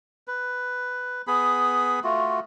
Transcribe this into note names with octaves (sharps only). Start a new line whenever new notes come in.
B4
B3 G#4 B5
A3 F4 F#4